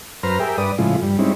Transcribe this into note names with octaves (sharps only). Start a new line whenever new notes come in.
F#2 B4 C5 A#5 F6
G4 G#4 A#4 E5 G5
G2 B4 D5 D#6
A2 C#3 F3 G#3 E4 F4
G2 G3
G3 G#3 C4 C#4 D#4 E4